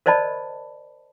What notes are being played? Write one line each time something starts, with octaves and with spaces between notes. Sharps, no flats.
A#4 C5 D5 D#5 A5 B5